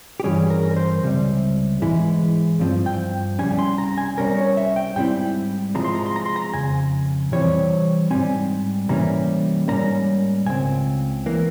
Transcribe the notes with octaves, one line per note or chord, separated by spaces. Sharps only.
G4
G2 E3 G3 C#4 G#4
A#4
A#4
C5
C#2 C3 G3
G#2 E3 G#3 E4
G2 F3 C4
G5
C2 A#2 G3 C#4 G#5
C6
A#5
G#5
C2 C3 G3 C#4 A#4
C#5
E5
G5
G#2 G3 C4 E4 G5
C3 F3 G#3 A#5
C6
A#5
C6
A#5
C6
A#5
F2 C#3 G#5
C3 E3 G3 C4 C#5
G#2 G3 C4 G#5
C3 E3 G3 A#3 C#4 A#5
G#2 G3 A#3 C#4 A#5
C#2 C#3 C4 G#5
E3 A#3